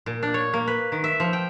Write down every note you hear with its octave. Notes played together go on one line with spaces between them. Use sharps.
A#2
D4
C#5
A#3
B4
D#3
E5
F3
G5